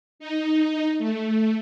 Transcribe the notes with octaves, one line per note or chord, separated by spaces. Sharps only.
D#4
A3